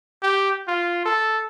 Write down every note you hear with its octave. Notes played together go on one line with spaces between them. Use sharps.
G4
F4
A4